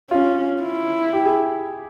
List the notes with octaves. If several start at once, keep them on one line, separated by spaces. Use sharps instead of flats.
C#4 F4
E4
G4
G#4